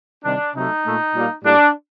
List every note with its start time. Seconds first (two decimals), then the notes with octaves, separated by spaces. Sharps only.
0.24 C3 D#3 G3 D4
0.54 C3 F#3 A3 D#4
0.85 A#2 A3
1.14 A#2 G3 A#3
1.43 A2 G3 A#3 D4